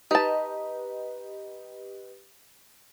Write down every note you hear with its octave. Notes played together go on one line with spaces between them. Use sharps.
D#4 G4 B4 D#5 A5